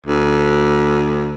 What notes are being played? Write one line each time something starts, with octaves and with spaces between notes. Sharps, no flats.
D2